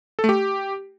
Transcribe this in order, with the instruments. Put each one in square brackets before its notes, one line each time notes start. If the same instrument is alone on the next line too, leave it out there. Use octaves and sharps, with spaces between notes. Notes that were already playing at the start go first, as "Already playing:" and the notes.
[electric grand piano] A4
A3
G4